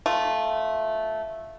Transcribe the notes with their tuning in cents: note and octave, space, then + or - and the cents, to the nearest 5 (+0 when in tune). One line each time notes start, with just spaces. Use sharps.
A3 -10 F4 +0